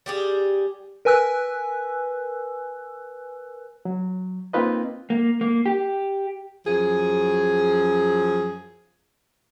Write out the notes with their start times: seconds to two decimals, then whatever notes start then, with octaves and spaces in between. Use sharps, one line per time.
0.06 G3 G4 G#4
1.05 A#4 B4 G#5 E6 F#6
3.85 F#3
4.53 A#3 C4 D#4 F4 B4 D#5
5.10 A#3
5.41 A#3
5.66 G4
6.66 F#2 F3 G#4